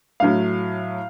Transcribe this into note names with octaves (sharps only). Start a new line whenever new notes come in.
A2 F#3 A3 F5